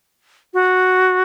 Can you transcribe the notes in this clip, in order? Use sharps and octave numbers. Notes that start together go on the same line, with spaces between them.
F#4